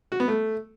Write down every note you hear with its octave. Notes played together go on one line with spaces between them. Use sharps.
F#4
B3
A3